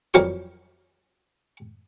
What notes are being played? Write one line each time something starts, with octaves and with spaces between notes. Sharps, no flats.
F2 E3 F#3 G3 A#4 C#5